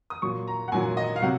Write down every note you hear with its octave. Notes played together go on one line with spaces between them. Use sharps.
D#6
A#2 F#3 C#6
A#5
F#5
A#2 F#3 G#5
D#5
F5
C3 F#3 F#5